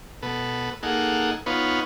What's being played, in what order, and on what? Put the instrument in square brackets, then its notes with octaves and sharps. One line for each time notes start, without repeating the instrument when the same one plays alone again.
[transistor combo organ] B2 A4 B4
A#3 D#4 G#4 A4 F#5
B3 D#4 F4 B4 C#5